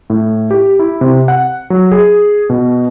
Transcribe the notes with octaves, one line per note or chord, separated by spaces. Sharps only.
A2
G4
E4
C3
F#5
F#3
G#4
B2